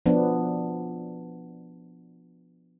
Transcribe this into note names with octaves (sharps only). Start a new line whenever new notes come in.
F3 B3 D4